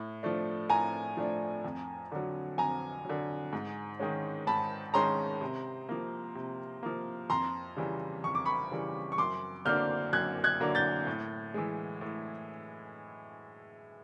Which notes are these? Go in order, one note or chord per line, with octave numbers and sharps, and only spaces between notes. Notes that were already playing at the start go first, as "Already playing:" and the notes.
Already playing: A2
F3 A3 D4
A2 G#5 A#5
F3 A3 D4
F2
D3 F#3
F2 G#5 A#5
D3 F#3
G#2
D#3 G#3 C#4
G#2 A5 B5
D#3 G#3 C#4 A#5 C6
C3
F3 A#3
C3
F3 A#3
F2 A#5 C6
C#3 E3 G3
F2 C#6
D6
B5 C#6
C#3 E3 G3
C#6
F#2 C6 D6
D3 F#3 A#3 D4 F6 G6
F#2 F#6 G#6
F#6 G#6
D3 F#3 A#3 D4
G6 A6
A2
E3 G#3
A2